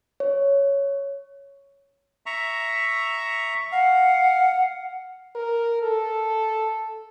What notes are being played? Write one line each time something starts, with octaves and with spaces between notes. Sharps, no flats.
C#5
E5 A#5 C#6
F5 F#5
A#4
A4